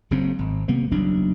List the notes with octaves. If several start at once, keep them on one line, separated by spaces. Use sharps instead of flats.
F#1 F#2 C#3 C4
G#1
C3 G3 A#3 B3
F#1 B1 E2 D4